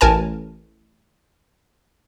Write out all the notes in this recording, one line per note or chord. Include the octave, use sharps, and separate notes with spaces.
A1 A#4 G#5 A5